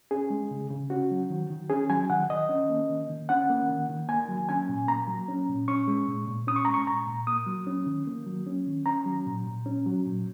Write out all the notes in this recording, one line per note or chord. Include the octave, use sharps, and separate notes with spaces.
C#4 G#4
G#3
C#3
C#3
C#4 F#4
F#3
D#3
D#3
C#4 G#4
F#3 G#5
D#3 F#5
D#3 D#5
C#4
A#3
D#3
D#3
C#4 F#5
A#3
D#3
D#3
A#3 G#5
F#3
C#4 G#5
A#2
A#3 A#5
F#3
C#4
A#2
C#4 C#6
G#3
A#2
A#2
C#4 D#6
C#6
G#3 A#5
C#6
A#2 A#5
A#2
A#3 D#6
F#3
C#4
D#3
A#3
F#3
C#4
D#3
C#4 A#5
F#3
A#2
A#2
C#4
F#3
A#2